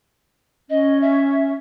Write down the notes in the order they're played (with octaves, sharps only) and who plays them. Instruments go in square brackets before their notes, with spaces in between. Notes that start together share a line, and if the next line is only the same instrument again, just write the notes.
[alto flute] C#4 [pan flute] D#5
[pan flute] E5